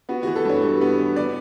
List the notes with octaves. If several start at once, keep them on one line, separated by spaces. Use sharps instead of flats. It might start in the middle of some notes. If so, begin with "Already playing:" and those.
B3 F#4
E3 F#4
A4
G2 C#5
G3
B3
E3
B3 D5